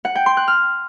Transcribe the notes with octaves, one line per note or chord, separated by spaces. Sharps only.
F#5
G5
C6
F#6
F6